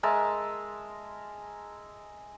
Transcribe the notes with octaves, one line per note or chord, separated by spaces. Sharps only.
G#3 A#4 E5 A5